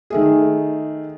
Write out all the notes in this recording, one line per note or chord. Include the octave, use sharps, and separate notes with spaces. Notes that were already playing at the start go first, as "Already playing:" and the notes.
D#3 A3 G#4